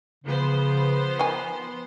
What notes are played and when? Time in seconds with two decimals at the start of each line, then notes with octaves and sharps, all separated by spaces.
0.24 C#3 F3 B3 C5
1.19 D#3 G#5